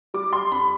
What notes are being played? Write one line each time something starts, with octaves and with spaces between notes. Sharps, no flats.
G3 D6
C6
F2 B5